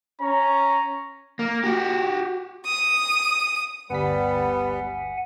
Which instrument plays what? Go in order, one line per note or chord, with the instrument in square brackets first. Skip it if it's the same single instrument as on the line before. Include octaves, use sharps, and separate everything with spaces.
[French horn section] C#4 [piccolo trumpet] A#5
[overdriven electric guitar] A#3
F#4 G4
[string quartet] D#6
[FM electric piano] G1 D2 B6 [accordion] G3 [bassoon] B3 [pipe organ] F#5 G#5